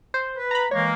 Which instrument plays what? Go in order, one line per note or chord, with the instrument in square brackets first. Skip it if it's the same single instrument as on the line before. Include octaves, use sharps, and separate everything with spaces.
[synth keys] C5
[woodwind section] B4
[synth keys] A#5 B5
[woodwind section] E3 G#3 A#3 [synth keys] C#5